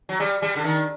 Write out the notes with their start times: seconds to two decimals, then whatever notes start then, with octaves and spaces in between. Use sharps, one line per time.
0.09 F#3
0.20 G3
0.42 G3
0.56 D3
0.64 D#3